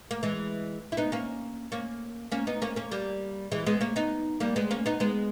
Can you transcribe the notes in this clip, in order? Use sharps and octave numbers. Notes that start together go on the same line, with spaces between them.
A#3
E3 G#3
E4
B3 D#4
A#3 C#4
A#3 C#4
A#3 C#4
B3 D#4
A#3 C#4
A#3 C#4
G3 A#3
E3 G#3
G#3 B3
A#3 C#4
B3 D#4
G3 A#3
G#3 B3
A#3 C#4
B3 D#4
G#3 B3